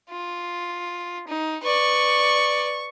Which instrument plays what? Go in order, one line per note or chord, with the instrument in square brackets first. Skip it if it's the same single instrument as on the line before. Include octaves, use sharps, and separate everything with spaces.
[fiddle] F4
D#4
[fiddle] B4 D5 [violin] C#6